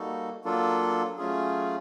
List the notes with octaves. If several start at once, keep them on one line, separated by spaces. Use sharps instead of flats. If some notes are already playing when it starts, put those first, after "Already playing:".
Already playing: G3 A#3 D#4 F#4 A4
F#3 A#3 D4 F4 A4
F#3 A3 C#4 F4 G#4